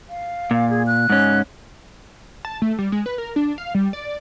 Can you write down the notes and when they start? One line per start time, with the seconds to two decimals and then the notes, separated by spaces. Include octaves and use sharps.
0.09 F5
0.51 A#2
0.70 G#4
0.87 F#6
1.10 G#2 C#4
2.45 A5
2.62 A3
2.79 G3
2.92 G#3
3.06 B4
3.18 A#4
3.36 D4
3.58 F5
3.75 G3
3.93 D5